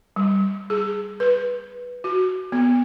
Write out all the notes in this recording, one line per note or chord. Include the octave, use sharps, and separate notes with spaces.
G3
G#4
B4
F#4
B3